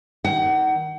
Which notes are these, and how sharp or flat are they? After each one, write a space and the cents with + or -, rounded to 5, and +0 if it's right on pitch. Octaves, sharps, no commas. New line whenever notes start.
D#3 +25 F#5 +30